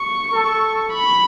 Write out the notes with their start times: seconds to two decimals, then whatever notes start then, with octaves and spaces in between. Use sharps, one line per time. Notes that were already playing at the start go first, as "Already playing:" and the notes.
Already playing: C#6
0.33 A4
0.93 B5